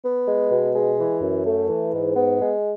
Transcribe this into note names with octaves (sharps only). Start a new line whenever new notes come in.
B3
G#3
B2
G#3
E3
F#2
A3
E3
G#2
B3
G#3